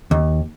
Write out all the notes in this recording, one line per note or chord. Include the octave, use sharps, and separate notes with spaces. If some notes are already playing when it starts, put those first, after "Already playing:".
D#2